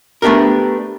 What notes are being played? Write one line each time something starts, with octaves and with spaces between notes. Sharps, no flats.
A3 B3 D4 G4 A#4